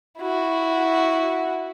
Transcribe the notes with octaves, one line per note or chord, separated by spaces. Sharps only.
E4 F#4